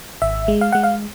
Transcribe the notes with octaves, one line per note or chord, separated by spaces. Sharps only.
G#1 E5
G#3
F5
G#3 F#5
F5